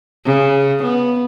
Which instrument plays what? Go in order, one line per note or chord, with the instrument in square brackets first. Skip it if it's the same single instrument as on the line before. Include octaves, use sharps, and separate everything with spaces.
[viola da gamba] C#3
B3